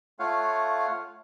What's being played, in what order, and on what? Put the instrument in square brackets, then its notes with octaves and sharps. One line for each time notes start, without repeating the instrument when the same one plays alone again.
[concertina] A3 F4 C#5 F5 F#5